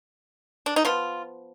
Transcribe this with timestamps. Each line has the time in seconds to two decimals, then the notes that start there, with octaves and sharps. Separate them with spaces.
0.66 D4
0.76 D#4
0.85 F3 B3 F4